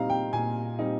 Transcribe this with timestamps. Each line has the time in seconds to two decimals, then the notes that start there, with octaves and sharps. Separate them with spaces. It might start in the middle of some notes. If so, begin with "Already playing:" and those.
Already playing: A#2 G3 C4 D#4 F5 A#5
0.10 G5
0.33 A#2 G#5
0.79 G3 C4 D#4